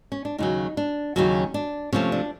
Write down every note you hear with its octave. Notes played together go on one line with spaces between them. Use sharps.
C#4
D4
D#2 C#3 F#3 D#4
D4
D#2 C#3 F#3 C#4
D4
C3 F3 A3 C#4
D4